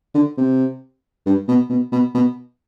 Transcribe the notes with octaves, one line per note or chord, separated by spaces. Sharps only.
D3
C3
G2
B2
B2
B2
B2